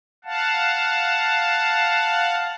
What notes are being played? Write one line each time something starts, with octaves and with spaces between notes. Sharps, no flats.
F5 F#5 A5